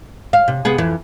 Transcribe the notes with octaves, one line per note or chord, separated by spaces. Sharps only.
F5
C3
C3 B3 G#4
F2 E3